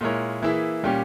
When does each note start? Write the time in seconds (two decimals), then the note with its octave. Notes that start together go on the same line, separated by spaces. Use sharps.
0.01 A#2 G#3 E4 A#4 C#5
0.42 E3 A#3 E4 G#4 E5
0.83 A#2 G3 C#4 G4